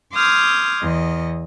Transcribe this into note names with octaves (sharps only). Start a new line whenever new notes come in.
C6 D6 D#6 F6 G6 G#6
E2 D#5